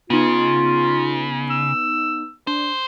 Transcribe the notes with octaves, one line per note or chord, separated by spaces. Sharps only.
C#3 B3 D#4 F4
E6
D4 C5